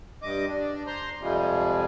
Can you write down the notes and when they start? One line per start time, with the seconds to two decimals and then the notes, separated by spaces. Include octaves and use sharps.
0.23 G2 D#5 D6
0.49 D4
0.87 C5 A#5 C6
1.21 F2 C3 F3 G3 G#3